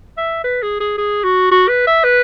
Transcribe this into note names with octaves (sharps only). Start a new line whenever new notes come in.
E5
B4
G#4
G#4
G#4
F#4
F#4
B4
E5
B4